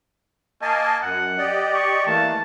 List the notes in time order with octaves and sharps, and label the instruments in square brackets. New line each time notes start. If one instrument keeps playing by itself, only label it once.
[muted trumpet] A#3 [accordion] D#5 G#5 A5
[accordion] F#2 [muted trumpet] F#5
[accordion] G4 D5 D#5
[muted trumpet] C#6
[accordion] E3 A3 A#3 [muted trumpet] A5